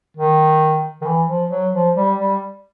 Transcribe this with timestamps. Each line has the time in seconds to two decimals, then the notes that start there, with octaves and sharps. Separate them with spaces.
0.17 D#3
1.02 D#3
1.06 E3
1.28 F3
1.51 F#3
1.74 F3
1.97 G3
2.19 G3